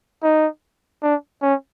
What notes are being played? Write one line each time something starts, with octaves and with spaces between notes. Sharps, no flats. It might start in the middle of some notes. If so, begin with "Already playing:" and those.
D#4
D4
C#4